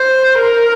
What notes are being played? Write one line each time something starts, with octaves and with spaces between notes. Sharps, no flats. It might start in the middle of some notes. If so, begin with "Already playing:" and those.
Already playing: C5
A#4